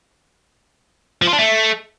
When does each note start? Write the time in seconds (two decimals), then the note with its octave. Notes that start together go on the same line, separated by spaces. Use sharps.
1.22 F3
1.27 F4
1.33 D4
1.39 A3